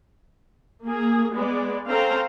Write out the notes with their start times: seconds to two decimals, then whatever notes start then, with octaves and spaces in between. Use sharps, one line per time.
0.84 A#3 G#4
1.33 G#3 B3 D5
1.88 C4 C#4 A4 C5 F5 A#5